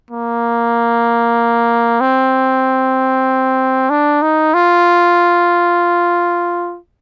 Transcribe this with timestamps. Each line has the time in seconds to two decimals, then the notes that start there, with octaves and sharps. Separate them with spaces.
0.11 A#3
2.01 C4
3.90 D4
4.22 D#4
4.54 F4